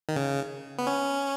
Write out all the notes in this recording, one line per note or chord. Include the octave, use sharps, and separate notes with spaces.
D#3
C#3
B3
C#4